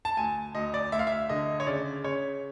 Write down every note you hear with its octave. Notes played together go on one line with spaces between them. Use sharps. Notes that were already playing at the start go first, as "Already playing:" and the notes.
A5
D2 G#5
D2 D#5
D5
D2 E5
F5
E5
D3 D#5
C#5
C#3 D5
C#3 C#5